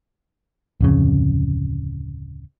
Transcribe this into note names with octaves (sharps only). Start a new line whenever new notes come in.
D1 F2 C#3